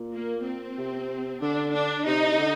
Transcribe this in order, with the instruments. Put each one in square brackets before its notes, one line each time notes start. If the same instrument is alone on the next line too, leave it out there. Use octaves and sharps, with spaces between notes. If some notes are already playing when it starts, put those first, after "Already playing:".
Already playing: [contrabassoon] A#2
[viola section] A#3
C4
[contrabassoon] C3
[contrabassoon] D3 [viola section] D4
[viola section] D4
[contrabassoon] C3 [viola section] D#4
[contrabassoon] C3
D3